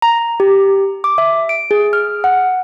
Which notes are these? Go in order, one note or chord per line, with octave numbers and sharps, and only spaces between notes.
A#5
G4
D6
E5
D7
G#4
F6
F#5